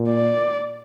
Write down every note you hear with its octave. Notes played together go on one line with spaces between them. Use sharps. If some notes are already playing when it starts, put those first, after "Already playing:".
Already playing: A#2
D5